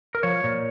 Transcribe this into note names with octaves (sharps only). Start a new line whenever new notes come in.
A#4
F3 C#5
A#2